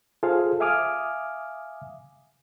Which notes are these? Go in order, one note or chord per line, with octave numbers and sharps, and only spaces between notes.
F4 G#4 A4 C5 F5
E5 F5 G#5 D6 D#6 F6